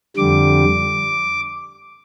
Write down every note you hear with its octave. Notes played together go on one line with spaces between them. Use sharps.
F2 D3 G3 D6